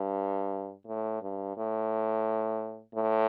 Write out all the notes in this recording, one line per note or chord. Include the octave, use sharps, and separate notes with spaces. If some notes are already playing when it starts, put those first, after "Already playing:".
Already playing: G2
A2
G2
A2
A2